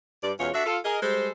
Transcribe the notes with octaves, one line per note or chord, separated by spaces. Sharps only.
G2 D5
E2 B2 G#3 C#4 F4 C#5
D4 F#4 A4 E5
F4 A4
G#4 A#4 D#5
G3 G#3 A4 C5